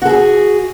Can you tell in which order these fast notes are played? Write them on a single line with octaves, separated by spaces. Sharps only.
F#4 A4 G#4